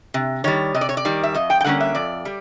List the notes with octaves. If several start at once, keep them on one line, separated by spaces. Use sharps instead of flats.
C3
D#3 G3 C#5
C3 D#5
D5
C#5
D5
D#3 G3
E5
F2 D#5
G5
G5
D3 G3 A#3 C#4 F#5
E5
F2 D5
G3